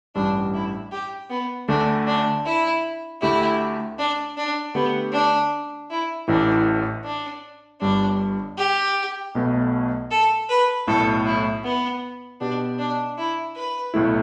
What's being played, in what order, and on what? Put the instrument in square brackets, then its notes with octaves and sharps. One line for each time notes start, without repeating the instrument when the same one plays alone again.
[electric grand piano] A1 G2 G3 [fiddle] D4
[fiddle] E4
G4
B3
[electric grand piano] D2 D3 A3 [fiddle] D4
[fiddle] D4
E4
[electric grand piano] D2 D3 A3 G4 [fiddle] E4
[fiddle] D4
D4
[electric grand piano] D3 A3 G4 B4 [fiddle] B3
[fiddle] D4
E4
[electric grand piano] A1 A2 E3 [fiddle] D4
[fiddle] D4
[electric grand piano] G1 G2 G3 [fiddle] D4
[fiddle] G4
[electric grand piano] B1 B2 A3
[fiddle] A4
B4
[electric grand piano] B1 A2 A3 [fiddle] A4
[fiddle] E4
B3
[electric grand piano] B2 B3 G4 [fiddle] D4
[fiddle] D4
E4
B4
[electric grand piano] B1 A2 A3 E4